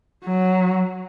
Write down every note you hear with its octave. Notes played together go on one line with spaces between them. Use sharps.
F#3